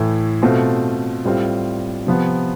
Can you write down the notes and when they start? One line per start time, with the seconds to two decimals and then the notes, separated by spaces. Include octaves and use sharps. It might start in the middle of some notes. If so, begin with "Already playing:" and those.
Already playing: A2 E3 A3 E4
0.42 B2 A3 C4 F4
1.25 A2 G3 C4 F4
2.07 C3 F3 B3